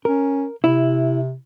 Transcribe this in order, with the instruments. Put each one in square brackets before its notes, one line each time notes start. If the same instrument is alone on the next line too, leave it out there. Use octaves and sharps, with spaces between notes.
[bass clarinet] C#4 [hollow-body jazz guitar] A#4
[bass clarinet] C3 [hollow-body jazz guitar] E4